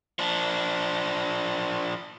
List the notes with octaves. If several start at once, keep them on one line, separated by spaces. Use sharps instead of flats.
F3 D4